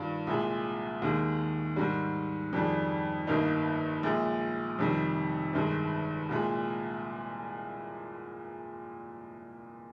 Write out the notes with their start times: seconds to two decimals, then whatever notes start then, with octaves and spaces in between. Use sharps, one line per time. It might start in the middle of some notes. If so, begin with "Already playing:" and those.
Already playing: G2 D#3 G3 D4 F4
0.27 C2 A#2 G#3
1.02 D#2 D#3 G#3
1.76 G#2 D#3 G3
2.53 F2 D#3 G3 D4 G#4
3.27 G1 G2 D#3 A#3 D#4
4.03 A#1 A#2 G#3
4.79 F2 C3 D#3 G3
5.53 G1 G2 D#3 G#3
6.29 C2 A#2 G#3